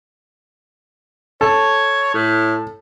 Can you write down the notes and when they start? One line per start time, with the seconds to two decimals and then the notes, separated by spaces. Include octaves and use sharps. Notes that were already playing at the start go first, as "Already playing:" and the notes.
1.41 A4 C#5
2.14 A2